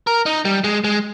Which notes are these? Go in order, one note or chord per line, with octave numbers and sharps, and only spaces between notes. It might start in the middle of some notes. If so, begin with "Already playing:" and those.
A#4
D#4
G3
G#3
G#3